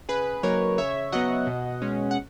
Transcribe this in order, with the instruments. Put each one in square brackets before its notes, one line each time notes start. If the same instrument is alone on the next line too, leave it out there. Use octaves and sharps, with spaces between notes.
[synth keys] C#3 G#4 B4
F#3 A#3 D#4 A#4 C#5
C#3 C#5 E5
F#3 B3 D#5 F#5
B2
G#3 C#4
F#5